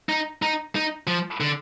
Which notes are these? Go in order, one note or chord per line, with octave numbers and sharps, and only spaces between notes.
D#4
D#4
D#4
F3
D3